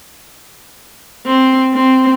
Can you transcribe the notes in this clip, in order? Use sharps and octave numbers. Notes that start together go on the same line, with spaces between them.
C4
C4